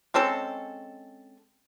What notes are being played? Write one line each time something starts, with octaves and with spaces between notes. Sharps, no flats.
G#3 C4 C#4 A4